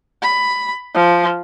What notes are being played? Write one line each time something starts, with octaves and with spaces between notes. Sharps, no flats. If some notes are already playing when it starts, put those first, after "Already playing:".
B5
F3